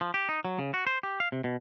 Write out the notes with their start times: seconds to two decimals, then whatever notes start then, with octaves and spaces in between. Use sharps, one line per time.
0.01 F3
0.14 G4
0.29 D#4
0.45 F#3
0.59 C#3
0.74 F#4
0.87 C5
1.03 G4
1.20 F5
1.32 C3
1.44 B2